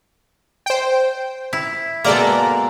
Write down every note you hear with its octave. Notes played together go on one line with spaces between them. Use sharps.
C5 G5
E4
B2 G#3 A#3 A4 D5 A#5